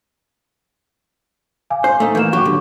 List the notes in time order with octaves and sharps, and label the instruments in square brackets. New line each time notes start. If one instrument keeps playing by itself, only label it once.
[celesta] F5 G#5 D6
[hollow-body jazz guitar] C5
A3 D#4
[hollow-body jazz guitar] E3 A#3 [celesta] G6 E7
[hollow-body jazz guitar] F#3 G4 [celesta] C#6 D6
[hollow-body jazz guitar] D3